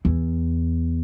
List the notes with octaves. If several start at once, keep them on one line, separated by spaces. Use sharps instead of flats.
E2